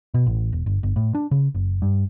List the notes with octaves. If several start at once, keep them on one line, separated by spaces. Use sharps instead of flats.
B2
A1
E1
G1
G1
A2
D4
C#3
F#1
G2